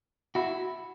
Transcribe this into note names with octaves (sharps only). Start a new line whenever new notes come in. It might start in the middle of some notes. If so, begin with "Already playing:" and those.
E4 F#4